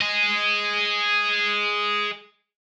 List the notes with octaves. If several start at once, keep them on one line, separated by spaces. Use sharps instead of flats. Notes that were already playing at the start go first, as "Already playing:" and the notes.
G#4 D#5